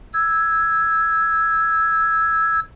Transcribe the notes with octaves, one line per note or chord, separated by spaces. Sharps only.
E6 G#6